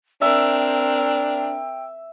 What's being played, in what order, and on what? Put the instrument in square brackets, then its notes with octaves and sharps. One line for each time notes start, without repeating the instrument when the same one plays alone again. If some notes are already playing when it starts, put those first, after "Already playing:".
[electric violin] C4 A#4 [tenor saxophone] D4 [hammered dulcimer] E5 [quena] G5